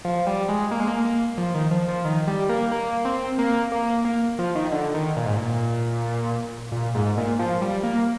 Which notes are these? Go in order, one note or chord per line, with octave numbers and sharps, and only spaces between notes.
F3
G3
G#3
A#3
G#3
A#3
A#3
F3
D#3
F3
F3
D#3
G3
A#3
A#3
C4
A#3
A#3
A#3
F3
D#3
D3
D#3
A#2
G#2
A#2
A#2
G#2
A#2
F3
G3
A#3